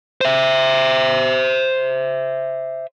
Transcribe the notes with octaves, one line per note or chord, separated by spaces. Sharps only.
C5 E5